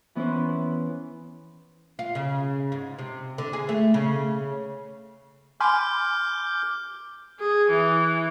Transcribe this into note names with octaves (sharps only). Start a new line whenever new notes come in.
E3 B3 C#4 E4 B4 C5
F4
C#3
G#2
C3
D3
G#4
A3
C#3
G#5 B5 C6 D6 F6 G6
G#4
E3